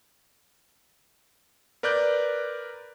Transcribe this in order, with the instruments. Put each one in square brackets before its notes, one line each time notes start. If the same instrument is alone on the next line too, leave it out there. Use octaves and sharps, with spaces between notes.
[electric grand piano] A#4 B4 D5 D6 F#6 G6